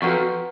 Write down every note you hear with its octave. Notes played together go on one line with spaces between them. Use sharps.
F2 F#4 B4 F#5 A#5 C#6